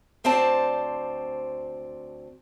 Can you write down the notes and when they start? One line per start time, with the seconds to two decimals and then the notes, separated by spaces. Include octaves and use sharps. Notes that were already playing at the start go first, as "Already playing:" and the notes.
0.24 D2 C4 C5 D5 A5